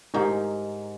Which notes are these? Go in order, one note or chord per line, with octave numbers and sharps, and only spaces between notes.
G#2 D#4 G4 A#4 D#5